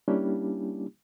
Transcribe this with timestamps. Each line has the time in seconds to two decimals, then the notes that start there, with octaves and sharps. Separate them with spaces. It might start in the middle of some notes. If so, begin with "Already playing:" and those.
0.08 G3 A#3 C#4 D4 E4 G4